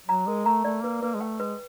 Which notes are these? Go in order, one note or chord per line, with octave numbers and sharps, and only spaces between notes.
F#3 A#5
G#3 A#4
A3 A#5
A3 D5
A#3 B4
A#3 B4
G#3
A3 G5
G#3 B4